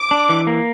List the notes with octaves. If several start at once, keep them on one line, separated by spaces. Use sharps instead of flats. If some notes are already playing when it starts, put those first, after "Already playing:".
Already playing: D6
D4
E3
A#3